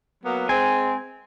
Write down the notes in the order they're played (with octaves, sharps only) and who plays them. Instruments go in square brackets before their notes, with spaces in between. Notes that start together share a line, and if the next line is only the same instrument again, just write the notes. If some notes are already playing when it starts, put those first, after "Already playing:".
[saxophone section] F#3 A#3 B3
[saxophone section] G#3 C4 [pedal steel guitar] G#5